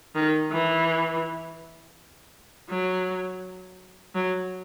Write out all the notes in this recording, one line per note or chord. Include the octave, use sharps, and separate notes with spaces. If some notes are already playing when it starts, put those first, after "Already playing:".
D#3
E3
F#3
F#3